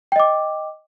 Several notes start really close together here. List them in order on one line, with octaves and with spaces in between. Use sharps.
G5 D#5 D6